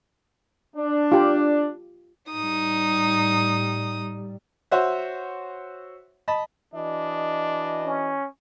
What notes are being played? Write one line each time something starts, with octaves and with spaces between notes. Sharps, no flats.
D4
F4 G4
A2 G3 D#4 D#6
F#4 C5 C#5 E5 F#5
D#5 A5 B5
E3 D4 F#4 D#5
C#4